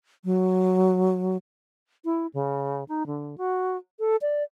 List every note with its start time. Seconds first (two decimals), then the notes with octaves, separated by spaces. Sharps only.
0.25 F#3
2.05 E4
2.34 C#3
2.88 D#4
3.06 D3
3.38 F#4
4.00 A4
4.22 D5